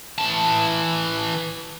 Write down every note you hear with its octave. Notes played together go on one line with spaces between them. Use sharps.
E3 A5